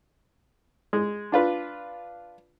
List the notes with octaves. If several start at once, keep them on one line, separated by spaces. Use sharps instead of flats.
G#3
D4 F4 B4